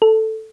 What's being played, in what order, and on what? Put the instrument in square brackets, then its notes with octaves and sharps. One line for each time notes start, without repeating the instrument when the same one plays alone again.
[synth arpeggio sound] A4